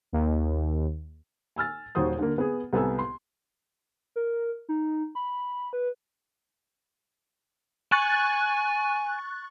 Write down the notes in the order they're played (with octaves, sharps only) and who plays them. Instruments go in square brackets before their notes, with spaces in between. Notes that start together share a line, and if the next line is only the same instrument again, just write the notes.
[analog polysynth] D#2
[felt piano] G#5 E6 F6 A6
D#1 D#2 F#4 C5 D#6
D3 A#3
B3 G#4
C2 B3 A4 G#5 E6
C6
[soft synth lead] A#4
D#4
B5
B4
[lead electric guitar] G#5 [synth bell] C#6 F#6 A6